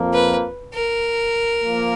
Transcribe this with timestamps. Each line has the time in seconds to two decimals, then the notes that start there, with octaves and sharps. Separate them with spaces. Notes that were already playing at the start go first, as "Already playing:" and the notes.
Already playing: F2 F3 A#3
0.13 B4
0.73 A#4
1.64 F3 A#3